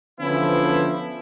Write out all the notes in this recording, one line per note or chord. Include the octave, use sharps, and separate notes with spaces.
D3 E3 F3 B3 C#4 E4